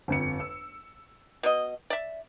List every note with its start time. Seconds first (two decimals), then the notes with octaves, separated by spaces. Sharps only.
0.08 G1 F2 C#7
0.40 E6
1.43 B2 D#5
1.90 D5 E5